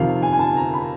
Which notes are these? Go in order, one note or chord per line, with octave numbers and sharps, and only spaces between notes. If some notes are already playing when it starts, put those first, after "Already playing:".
Already playing: F2 C3 D#3 F5
G#5
G#5
A5
A#5
B5